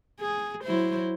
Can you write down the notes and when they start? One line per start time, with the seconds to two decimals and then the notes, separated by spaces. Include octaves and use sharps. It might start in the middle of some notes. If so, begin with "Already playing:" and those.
0.20 G#4
0.64 F#3 E4 C5